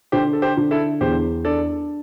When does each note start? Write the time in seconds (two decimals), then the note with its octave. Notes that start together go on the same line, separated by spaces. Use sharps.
0.12 D3 G4 C5
0.33 A4
0.42 G4 C5
0.57 D3
0.71 E4 A4
1.01 E2 G4 C5
1.44 D4 A4 D5